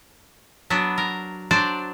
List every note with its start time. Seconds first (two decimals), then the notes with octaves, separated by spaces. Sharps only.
0.70 F#3 B3 D4
0.98 A#4
1.51 F#3 D4 C5 D5